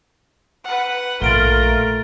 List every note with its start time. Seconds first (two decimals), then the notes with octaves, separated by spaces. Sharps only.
0.64 B4 F#5
1.22 A#1 A3 F4 A#4 A6 D7 G7